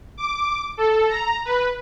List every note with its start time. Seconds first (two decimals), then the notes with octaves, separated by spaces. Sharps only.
0.17 D6
0.77 A4
1.09 A#5
1.45 B4